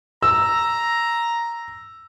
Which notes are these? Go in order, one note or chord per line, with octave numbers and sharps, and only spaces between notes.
A#5 E6